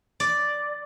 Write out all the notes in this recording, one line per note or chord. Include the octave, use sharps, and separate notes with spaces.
D5